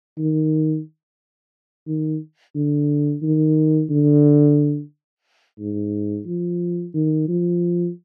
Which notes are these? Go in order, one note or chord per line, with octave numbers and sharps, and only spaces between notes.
D#3
D#3
D3
D#3
D3
G#2
F3
D#3
F3